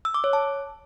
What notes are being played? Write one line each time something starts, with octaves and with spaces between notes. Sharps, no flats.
E6
D6
C#5
A5